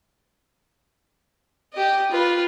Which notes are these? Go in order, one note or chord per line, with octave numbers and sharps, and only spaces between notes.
G4 D#5
F4 B4